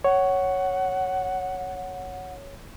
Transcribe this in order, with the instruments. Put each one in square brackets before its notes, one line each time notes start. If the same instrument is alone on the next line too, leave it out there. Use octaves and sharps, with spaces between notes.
[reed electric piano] C#5 [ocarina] F#5